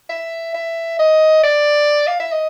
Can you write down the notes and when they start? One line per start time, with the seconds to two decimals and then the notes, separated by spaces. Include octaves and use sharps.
0.10 E5
0.54 E5
0.99 D#5
1.43 D5
2.07 F5
2.20 E5
2.32 D#5